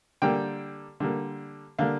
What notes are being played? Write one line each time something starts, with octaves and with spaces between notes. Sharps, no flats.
D3 G3 A#3 G5
D3 G3 A#3
D3 G3 A#3 F5